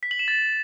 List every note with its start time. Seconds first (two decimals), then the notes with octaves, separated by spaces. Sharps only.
0.03 B6
0.11 F#7
0.19 E7
0.28 A6